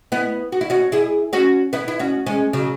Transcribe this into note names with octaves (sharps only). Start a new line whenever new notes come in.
B3 E4
F#4
E4
C#4 F#4
E4 G#4
C#4 F#4
B3 E4
E4
C#4 F#4
G#3 C#4
C#3 F#3